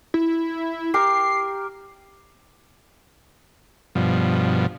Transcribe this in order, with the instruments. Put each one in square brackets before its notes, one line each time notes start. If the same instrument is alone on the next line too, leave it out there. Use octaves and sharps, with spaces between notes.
[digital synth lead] E4
[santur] G4 A#4 [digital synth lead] C7
[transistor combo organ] G2 B2 F3